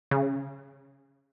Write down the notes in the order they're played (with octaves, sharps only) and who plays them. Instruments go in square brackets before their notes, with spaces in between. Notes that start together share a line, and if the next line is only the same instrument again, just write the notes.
[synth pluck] C#3